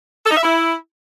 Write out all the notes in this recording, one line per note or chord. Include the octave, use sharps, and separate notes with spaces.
A4
D#4
E5
E4